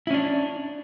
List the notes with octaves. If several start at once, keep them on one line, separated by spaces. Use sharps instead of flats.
C#4 D4 E4